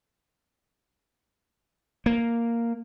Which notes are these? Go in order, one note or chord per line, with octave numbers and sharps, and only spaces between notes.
A#3